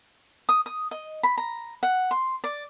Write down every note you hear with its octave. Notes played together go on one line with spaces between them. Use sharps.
D#6
D#6
D#5
B5
A#5
F#5
C6
D5